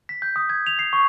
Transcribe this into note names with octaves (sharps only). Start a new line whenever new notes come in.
B6
G6
D#6
G#6
F7
C7
C#6